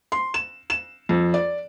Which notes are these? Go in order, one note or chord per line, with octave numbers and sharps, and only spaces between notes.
C6
E7
E7
F2
D5